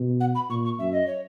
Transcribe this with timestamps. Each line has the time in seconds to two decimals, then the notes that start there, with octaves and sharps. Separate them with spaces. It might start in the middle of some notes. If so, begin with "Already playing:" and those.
Already playing: B2
0.20 F#5
0.35 B5
0.50 A#2 C#6
0.65 C#6
0.79 F#2 E5
0.93 D#5
1.07 C#5